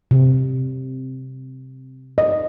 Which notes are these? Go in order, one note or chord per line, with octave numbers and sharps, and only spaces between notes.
C3
D#5